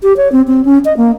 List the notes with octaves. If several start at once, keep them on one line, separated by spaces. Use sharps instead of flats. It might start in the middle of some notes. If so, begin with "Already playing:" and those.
G4
C#5
C4
C4
C#4
D#5
A#3